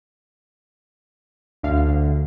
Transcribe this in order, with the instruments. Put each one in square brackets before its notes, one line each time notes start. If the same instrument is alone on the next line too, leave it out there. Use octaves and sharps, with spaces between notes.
[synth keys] D2 F5 [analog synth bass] D3
[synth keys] D2